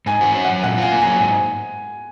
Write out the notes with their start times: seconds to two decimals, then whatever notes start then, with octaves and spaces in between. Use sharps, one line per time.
0.06 G#2 G#5
0.21 F#4
0.35 C#4
0.44 F#3 F#5
0.63 A#2 F#5
0.78 F4 G#5
0.92 A#3
1.01 F#3 G#5
1.20 G#2 G#5